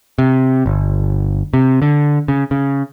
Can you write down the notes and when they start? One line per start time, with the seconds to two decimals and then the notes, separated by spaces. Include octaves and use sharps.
0.18 C3
0.66 G1
1.54 C3
1.82 D3
2.28 C#3
2.51 C#3